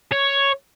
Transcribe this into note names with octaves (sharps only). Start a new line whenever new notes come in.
C#5